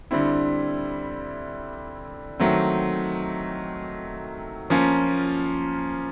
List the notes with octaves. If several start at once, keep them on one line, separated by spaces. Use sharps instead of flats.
D3 G3 C4 E4
D#3 F#3 A3 C4
F3 A#3 C#4 F4